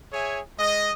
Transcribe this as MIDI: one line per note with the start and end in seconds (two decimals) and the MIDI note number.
0.12 0.40 68
0.12 0.40 73
0.12 0.40 76
0.12 0.40 80
0.59 0.93 56
0.59 0.93 75